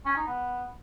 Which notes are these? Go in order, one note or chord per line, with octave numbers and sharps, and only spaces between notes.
C#4
D#4
B3